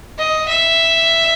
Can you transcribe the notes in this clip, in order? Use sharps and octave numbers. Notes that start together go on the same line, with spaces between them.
D#5
E5